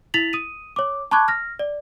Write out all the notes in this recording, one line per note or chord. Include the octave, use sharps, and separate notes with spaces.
E4 A6 B6 F7 F#7
D#6 D#7
C#5 D6
A5 B5 C#6 D6 F#6 G#6
F6 A#6
D5